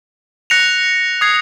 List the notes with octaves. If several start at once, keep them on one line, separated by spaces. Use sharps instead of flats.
F#6 A#6 C#7 F7
D#6 G#6 C7